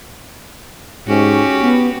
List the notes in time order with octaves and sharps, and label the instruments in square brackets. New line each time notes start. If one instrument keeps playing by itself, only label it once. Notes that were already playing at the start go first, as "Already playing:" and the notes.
[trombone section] G#2 [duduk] C#4 [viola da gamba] F#4 G4
[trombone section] B3